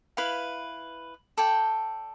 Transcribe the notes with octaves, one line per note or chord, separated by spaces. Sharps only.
E4 B4 F5 B5
A4 D5 G5